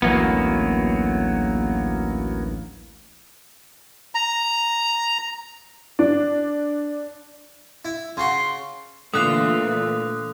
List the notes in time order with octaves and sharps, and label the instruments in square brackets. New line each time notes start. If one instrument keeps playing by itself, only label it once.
[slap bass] A1 D2 [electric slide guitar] F#3 A#3 B3
[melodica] A#5
[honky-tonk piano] D4
[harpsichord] E4
[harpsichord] C#3 F#4 [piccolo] C6
[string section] A#2 E3 [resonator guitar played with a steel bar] D3 [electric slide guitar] A3 F4 [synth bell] D#6 F#6